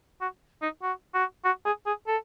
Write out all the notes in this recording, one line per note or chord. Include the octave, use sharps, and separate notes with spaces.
F#4
D#4
F#4
F#4
F#4
G#4
G#4
A4